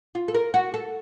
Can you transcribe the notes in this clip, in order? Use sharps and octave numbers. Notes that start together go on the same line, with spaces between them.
F4
A4
A#4
F#4
A4